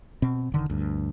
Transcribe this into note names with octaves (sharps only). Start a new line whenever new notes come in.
B2 C4
E1 D3 D#3
D2 G2